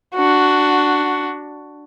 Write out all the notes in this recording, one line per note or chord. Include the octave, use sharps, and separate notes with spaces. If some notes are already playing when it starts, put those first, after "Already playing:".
D4 F#4